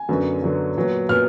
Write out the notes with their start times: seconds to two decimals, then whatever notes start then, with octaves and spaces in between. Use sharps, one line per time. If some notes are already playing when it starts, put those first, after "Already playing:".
Already playing: G#5
0.09 F#2 D3 F#3 B3
0.42 F#2 D3 F#3 B3
0.77 A#2 F#3 B3
1.09 A#2 F#3 B3 F6